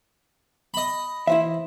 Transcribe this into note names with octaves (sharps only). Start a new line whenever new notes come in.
D#5 B5
E3 E4 C5 E5